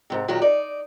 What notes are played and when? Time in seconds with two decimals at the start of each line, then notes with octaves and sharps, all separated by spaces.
0.10 G#2 C3
0.28 A#2 D#3 F#3 F#4 G4
0.42 D#4 D5